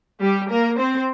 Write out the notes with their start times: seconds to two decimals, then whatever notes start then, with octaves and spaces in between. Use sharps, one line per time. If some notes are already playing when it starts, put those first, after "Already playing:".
0.21 G3 G4
0.50 A#3 A#4
0.77 C4 C5